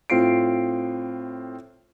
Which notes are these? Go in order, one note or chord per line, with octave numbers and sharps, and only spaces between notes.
A2 C4 F4 C7 D7